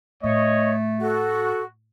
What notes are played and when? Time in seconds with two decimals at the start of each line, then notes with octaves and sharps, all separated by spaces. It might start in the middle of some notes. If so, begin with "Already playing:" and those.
0.23 A2 A3 C#5 D#5
1.01 F#4 A4